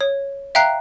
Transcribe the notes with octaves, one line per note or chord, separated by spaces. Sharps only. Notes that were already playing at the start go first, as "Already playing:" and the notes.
C#5
E5 F5 G5 A#5 F#6 C7